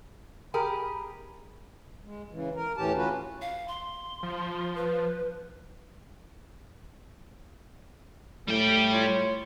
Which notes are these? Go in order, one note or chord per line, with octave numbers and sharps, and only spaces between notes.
G4 G#4 A#4 B5
G#3
C#3 E3
A#4
D2 A2 E3 C#4 G4 A5
C#4 F4 F#4 B4
F5
C6
F3
B4
A2 G3 G5
E4 F4 C#5